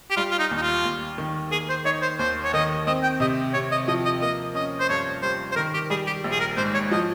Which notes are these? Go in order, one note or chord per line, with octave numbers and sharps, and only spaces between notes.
G4
G3 F4
F4
D#4
D#2
D#4
F4
D#2
D#3
A#3 G#4
C5
D#4 C#5
C5
D#2 C5
C#5
D#3 D#5
C4 D#5
G5
C3 D#5
C3 C#5
D#5
F3 D#5
D#5
A#3 D#5
C#4 D#5
C5
G2 C#5
G3 C5
C5
D#3 A#4
G4
G3 G#4
G4
A#1
G#4
A#4
G#2 C5
C#5
F3 D#5